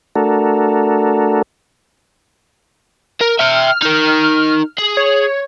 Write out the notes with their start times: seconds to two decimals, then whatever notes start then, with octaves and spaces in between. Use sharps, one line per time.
0.16 A3 D4 F#4 A4 A#4
3.21 A#4
3.40 E5 G5 F6
3.82 D#4 A#4
4.78 G#4
4.97 C#5